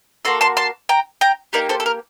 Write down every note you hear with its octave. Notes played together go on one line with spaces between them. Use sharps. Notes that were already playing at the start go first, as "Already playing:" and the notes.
A#3 F#4 A4 C6
A5 C6
A5 C6
G5 A#5
G5 A#5
A#3 D#4 G4 A#4 D5
A4 C5
A4
A#4